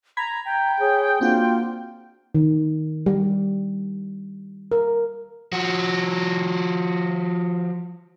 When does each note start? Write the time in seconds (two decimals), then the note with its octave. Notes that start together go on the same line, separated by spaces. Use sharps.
0.17 A#5 B5 G#6 B6
0.45 G5 A#5
0.80 G#4 C#5
1.21 A#3 C4 D4 F4 F#4
2.35 D#3
3.06 G3
4.72 A#4
5.52 F3 F#4